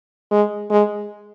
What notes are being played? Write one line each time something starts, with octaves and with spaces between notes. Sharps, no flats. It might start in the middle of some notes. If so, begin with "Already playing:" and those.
G#3
G#3